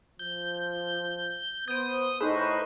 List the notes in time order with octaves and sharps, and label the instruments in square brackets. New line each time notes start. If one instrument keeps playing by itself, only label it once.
[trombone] F3 [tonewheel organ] G6
[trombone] B3 [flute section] C5 [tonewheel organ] D#6 [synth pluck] G6 D7
[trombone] A2 [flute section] D#4 B5 C#6 [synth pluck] G#4 [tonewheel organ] B4 C5